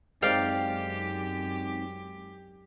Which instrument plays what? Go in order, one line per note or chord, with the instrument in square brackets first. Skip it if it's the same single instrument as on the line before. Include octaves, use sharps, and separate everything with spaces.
[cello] F#2 G4 [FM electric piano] G#3 C4 D#4 [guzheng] D5 F5 G5